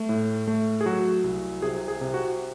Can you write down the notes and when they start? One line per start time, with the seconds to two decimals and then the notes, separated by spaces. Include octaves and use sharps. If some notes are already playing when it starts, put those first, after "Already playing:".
Already playing: A3
0.09 A2
0.48 A3
0.81 G#4
0.85 F#3 F#4
1.24 C2
1.62 C3 G#4
1.88 G#4
2.01 C3
2.14 F#4